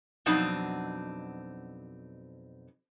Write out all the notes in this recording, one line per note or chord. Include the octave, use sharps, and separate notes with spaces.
F2 B2 F#3 C4 D4 D#4